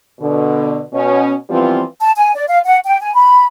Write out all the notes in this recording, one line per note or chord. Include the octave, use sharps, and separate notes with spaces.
B2 D3
B2 C#4
E3 F3 G3 B3 C4 F4
A5
G#5
D5
F5
F#5
G5
G#5
B5